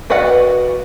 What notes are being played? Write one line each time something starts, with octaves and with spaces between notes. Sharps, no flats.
F#4 B4 D5 D#5 F#5